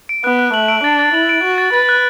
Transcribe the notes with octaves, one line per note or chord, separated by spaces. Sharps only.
D7
B3 F#6
F#6
A3 F#7
D7
D4 A6
A6
E4 F#7
D7
F#4 A6
A6
B4 A6
F#6